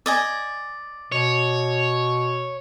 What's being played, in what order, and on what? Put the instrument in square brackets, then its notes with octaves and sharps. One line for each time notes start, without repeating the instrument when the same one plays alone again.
[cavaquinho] D5 D#5 G#5
[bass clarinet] B2 [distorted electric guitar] C#5